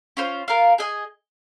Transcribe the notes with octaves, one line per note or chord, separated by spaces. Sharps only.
C#4 F4 C5
F4 A#4 F5
G#4 D#5 G#5